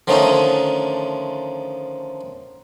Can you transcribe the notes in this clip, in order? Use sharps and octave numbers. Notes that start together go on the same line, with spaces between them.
D3 D#3 F3 A3 C#4 D#4